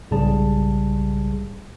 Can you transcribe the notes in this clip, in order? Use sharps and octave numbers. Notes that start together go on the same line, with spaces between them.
B1 G#2 C#3 G3 G#4 A5